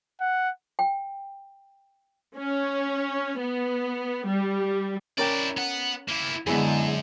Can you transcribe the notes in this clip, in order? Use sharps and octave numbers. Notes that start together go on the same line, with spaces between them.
F#5
G5
C#4
B3
G3
C#4 E4 A#4 D5 G5
B3 F#5
A#3 E4
F#2 D3 G#3 B3 E4 G#4